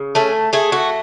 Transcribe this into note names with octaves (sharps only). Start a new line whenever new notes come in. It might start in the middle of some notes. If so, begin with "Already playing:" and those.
Already playing: C#3
A3 C#4
A3 G#4
F#4